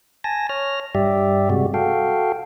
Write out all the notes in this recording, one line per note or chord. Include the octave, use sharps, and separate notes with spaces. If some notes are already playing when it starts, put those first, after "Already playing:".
G#5 A5 A#6
C#5 F6 A#6
G2 G3 G4 D5 E5
C3 G3 G#3 F#4
F#4 A4 F5 G5